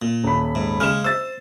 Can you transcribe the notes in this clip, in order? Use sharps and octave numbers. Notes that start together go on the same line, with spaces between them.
A#2
D#1 B5
G#2
C#3 G#3 C#4 F6 E7
C5 E6 A6